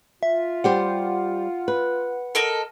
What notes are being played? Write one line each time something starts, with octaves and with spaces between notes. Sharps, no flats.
F4 E5
G3 G4 C5 F#5
B4
A4 A#4 D#5